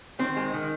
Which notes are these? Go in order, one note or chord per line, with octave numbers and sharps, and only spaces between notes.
D#3 C4
G#3
D#3